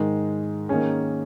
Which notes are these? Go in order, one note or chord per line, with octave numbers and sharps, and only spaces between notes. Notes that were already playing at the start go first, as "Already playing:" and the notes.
Already playing: G#2 D#3 G#3
D#3 A#3 C#4 G#4